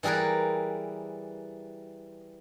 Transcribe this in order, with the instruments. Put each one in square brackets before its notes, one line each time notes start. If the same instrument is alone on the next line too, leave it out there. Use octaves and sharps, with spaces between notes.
[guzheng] E3 G3 G#4 A#4 B4